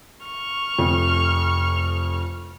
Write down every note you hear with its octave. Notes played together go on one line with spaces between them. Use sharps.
C#6 F6
F1 F2